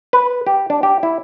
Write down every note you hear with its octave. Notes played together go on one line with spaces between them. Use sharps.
B4
G4
D4
G4
E4